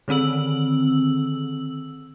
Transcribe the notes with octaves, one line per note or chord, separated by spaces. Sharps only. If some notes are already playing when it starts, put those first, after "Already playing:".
D3 D#3 C4 E6 F#7